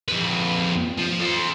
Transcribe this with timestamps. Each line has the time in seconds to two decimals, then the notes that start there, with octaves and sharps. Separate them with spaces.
0.08 F2 B4
0.98 F3
1.20 A4 C5